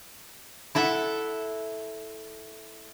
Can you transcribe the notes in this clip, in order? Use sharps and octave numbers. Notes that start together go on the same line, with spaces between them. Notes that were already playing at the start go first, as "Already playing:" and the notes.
E4 A4 E5 F#5